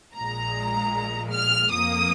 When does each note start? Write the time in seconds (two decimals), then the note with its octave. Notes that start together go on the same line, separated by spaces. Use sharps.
0.15 A#1 A#2 G#3 A#5
1.32 F6
1.71 F2 F3 A#3 D#6